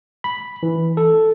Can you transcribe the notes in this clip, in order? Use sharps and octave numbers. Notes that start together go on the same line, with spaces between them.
B5
E3
A4